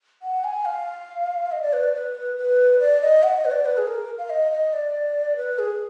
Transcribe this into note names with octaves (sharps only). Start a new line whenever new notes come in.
F#5
G#5
F5
D#5
D5
B4
D5
B4
B4
D5
D#5
F#5
D#5
B4
D5
B4
G#4
A#4
F5
D#5
D#5
D5
B4
G#4